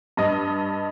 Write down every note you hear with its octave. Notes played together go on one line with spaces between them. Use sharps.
G2 D#5